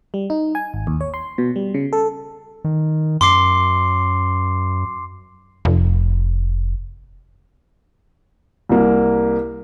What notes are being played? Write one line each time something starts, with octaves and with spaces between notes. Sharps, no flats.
G3
D#4
G#5
G#1
D#2
C#5
C6
B2
G3
C#3
A4
D#3
F#2 C6 D6 C7
F1
C2 A#3